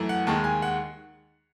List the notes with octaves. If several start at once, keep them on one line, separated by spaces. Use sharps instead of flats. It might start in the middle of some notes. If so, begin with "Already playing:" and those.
Already playing: F#2 E3 A3
F#5
D#2 D#3 G#3 A5
G#5
F#5